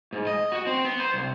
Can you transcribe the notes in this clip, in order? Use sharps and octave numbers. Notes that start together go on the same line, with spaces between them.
G#2
D#5
F#4
C4
B3
C5
C2